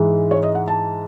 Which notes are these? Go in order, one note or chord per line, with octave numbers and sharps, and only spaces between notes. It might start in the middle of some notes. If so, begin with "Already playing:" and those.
Already playing: G#2 E3 G#3
C#5
D#5
F#5
A5